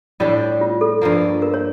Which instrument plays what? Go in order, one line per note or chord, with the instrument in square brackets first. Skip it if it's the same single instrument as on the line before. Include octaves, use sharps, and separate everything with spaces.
[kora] A2 G3 D4 G4
[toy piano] F4
A4
[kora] G2 F3 A#3
[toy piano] A#4
C#5